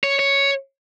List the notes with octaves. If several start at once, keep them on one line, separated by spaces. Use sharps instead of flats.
C#5
C#5